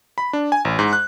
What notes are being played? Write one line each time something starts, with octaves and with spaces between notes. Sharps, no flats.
B5
D4
G#5
A1
G#2
F#6